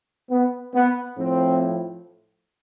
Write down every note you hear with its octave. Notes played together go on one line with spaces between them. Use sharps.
B3
B3
A2 F3 C4